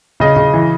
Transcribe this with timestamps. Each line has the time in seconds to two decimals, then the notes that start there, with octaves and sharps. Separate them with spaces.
0.20 C#3 D#5
0.36 C#3
0.53 E3